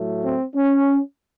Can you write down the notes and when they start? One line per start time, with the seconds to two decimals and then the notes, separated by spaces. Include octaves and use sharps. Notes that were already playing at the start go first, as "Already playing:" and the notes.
Already playing: A2 F#3 A3
0.23 C4
0.55 C#4